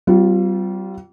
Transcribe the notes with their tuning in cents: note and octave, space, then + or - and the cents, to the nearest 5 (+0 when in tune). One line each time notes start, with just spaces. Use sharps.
G3 -35 C4 -40 F4 +0